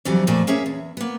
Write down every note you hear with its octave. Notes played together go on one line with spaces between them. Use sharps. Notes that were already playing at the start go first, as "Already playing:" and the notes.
F2 D3 E3 F#3 G3
F2 A#2 F3 A3 D5 A5
A#3 C#4 G#4 C#5 E5
E2
A#3 B3